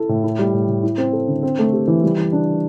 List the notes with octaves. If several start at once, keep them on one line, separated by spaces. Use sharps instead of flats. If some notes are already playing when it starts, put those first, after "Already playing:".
Already playing: E4 A4
A2
E4
G3
A2
A2
E4
C4
A4
D3
C4
A3
G4
E3
G3
E3
D4